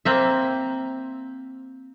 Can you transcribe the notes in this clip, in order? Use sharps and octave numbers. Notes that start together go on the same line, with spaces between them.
A#3 C4 E5